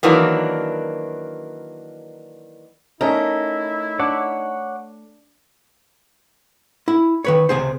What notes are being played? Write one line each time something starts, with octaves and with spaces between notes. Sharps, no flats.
D#3 E3 F#3 A#3 D4
A3 C#4 D#4 E4 A#4
D4 C#5 F#5 D6
E4
D#3 B4 C#5
C#2 C3 G#4 C5